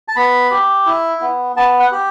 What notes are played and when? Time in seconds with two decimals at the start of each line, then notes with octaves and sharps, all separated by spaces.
0.08 A5
0.16 B3 B5
0.51 G4
0.86 E4
1.21 B3
1.56 B3 A5
1.80 F#5
1.92 G4